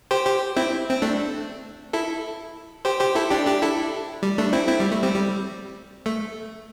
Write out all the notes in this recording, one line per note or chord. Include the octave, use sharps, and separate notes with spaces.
G4 C5
G4 C5
C4 E4
C4
A3 D4
E4 A4
G4 C5
G4 C5
E4 A4
D4 G4
D4 G4
E4 A4
G3
A3 D4
C4 E4
C4 E4
G3
A3
G3 C4
G3
A3